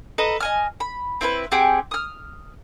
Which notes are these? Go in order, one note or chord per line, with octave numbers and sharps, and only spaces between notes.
A4 B4 D#5 A#5
D#5 G#5 F6
B5
C4 E4 A4 B4
C4 G4 G#4 F#5
D#6 F6